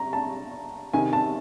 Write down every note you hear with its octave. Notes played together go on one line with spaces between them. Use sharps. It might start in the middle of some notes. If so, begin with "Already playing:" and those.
Already playing: A#5
A5
C3 D#3 G#5
A5